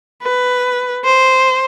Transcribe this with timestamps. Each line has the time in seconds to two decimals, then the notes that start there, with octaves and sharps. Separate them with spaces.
0.23 B4
1.05 C5